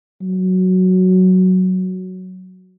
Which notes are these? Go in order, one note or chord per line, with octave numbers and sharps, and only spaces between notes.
F#3